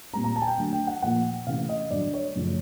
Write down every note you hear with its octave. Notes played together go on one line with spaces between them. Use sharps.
A#2 G3 C4 A#5
A#5
A5
G#5
G5
D3 F#3 A3
G5
F#5
A#2 F3 A#3 F#5
C3 E3 A3 C#4 F5
D#5
G2 D3 F#3 D5
C#5
F#2 C#3 F3 A3